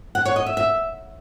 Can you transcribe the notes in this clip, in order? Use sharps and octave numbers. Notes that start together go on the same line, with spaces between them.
F#5
C#5
D#5
E5
E5